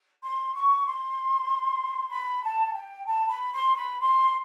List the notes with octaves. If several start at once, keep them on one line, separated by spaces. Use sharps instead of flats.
C6
C#6
C6
B5
A5
G5
A5
B5
C6
B5
C6